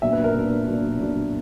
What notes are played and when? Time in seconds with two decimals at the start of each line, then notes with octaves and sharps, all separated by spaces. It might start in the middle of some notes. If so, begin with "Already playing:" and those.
0.02 A#2 F#3 B3 D4 E5
0.13 B4
0.24 A#4
0.35 A#2 F#3 B3 D4
0.67 A#2 F#3 B3 D4
0.99 A#2 F#3 B3 D4